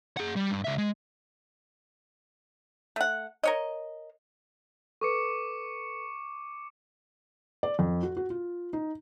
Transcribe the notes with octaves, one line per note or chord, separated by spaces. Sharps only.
G#4 F#5
G3
G2
C#2 E5
G#3
A3 F#5
A#4 C#5 D#5
A4 B4 C#6 D6 C#7
D5
F2
F#4
F#4
F4
D#4